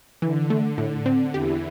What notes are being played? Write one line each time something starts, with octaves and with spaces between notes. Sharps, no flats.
D3 E3
A3
A2
C4
E2 E3 G4